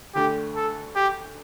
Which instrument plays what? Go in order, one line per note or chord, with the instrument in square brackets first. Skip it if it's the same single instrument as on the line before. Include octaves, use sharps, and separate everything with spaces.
[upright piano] D2 D3 A3 [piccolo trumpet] G4
[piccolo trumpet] A4
G4